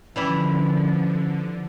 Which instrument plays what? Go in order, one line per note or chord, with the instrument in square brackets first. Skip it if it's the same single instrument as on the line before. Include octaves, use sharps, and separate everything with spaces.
[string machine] D3 [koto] E3 G3 E4 [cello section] F3 [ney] C#4